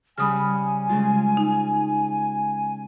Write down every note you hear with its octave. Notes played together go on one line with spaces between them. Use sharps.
C#3 G3 G#5 B5 D#6 F6
C#3 G#3 F4
D#4